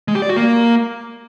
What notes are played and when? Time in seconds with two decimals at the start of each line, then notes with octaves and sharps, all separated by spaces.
0.08 G#3
0.15 G4
0.22 D5
0.29 F#4
0.36 A#3